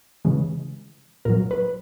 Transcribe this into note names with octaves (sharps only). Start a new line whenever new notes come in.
C#3 E3 G#3
A#2 F#3 A#4
B4